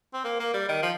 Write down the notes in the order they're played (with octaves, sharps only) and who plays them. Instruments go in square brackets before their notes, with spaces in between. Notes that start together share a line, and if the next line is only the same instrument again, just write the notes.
[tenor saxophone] C4
A#3
A#3
G3
D#3
F3